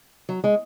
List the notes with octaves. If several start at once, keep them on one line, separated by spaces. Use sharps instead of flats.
F#3
G#3